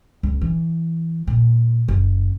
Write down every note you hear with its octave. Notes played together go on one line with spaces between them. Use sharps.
C#2
E3
A#2
F#1